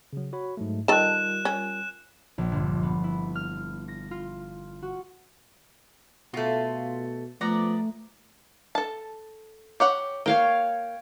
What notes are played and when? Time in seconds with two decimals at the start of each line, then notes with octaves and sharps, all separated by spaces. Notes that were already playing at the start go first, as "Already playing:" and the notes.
0.13 C#3 F#3
0.33 F#4 C#5 B5
0.57 G#2 F#3 A3
0.88 D#3 G3 F4 A4 A#4 F#6 E7
1.45 C#4
2.38 A#1
2.52 G1
2.83 B3
3.04 E4
3.35 F6
3.88 A#6
4.11 F4
4.82 F#4
6.34 B2 A3 F4 F#4
7.41 F3 A3 B3 D5 A#5
8.75 A4 A5
9.80 G4 C#5 F#5
10.26 A#3 C#5 F5 G5